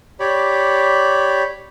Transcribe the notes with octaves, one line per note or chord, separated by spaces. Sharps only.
G4 C#5 D5 B5